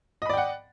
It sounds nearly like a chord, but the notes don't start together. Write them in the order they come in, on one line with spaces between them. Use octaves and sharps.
D#5 B5 D5 G5 F#5